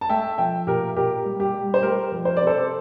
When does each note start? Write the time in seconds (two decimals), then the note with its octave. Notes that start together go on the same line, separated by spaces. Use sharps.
0.01 A5
0.09 A3 E5 G5
0.38 F3 E5 G5
0.67 A#2 G4 A#4
0.96 A#2 G4 A#4
1.24 G3
1.40 G4
1.53 G3
1.74 C5
1.82 A3 G4 A#4
2.12 F3
2.25 C5
2.37 C3 D5
2.47 A4 C5